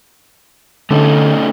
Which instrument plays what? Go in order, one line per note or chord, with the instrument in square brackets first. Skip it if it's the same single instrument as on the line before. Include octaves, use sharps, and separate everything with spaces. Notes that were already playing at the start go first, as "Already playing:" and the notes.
[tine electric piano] D3 [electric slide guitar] A3 C#4 D#4